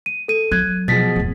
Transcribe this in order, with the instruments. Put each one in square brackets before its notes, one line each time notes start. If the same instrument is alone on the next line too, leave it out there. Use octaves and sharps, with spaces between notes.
[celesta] D#7
A4 D#7
[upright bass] F#3 [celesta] F#6 G#6
[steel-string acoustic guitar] B2 F3 G#4 [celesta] A6 B6
[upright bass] D1 F2